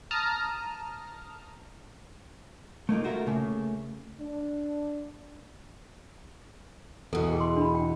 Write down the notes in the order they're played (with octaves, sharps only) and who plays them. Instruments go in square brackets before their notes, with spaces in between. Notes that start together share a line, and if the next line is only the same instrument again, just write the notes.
[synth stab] A5 A#5 D#6 F6
[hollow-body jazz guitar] A3 A#3 D#4 F4
F4 F#4 A4 A#4 C5 E5
C#3 A3 A#3
[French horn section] D4
[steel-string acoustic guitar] E2 B2 [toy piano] A4
[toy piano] G#4 G5
C6
D4 B5
G5